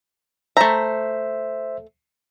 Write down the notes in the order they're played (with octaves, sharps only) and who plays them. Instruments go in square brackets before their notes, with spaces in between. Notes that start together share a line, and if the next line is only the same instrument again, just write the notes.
[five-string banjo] A3 A#5 [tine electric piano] C5 E5